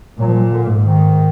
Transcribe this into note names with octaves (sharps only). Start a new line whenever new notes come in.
A#2 F#3
F3
F#3
D3
G#2
D#3